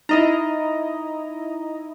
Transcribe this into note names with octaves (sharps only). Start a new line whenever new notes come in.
D#4 E4 D#5 A#5